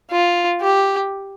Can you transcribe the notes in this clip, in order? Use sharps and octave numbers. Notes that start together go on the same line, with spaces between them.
F4
G4